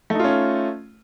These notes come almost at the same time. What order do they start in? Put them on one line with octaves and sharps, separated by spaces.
A3 D#4 F4 C#4